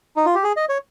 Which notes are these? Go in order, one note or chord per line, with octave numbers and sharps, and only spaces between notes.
D#4
F4
G4
G#4
D#5
C#5